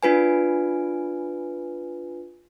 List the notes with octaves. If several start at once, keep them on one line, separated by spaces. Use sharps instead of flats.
D4 F4 B4 G#5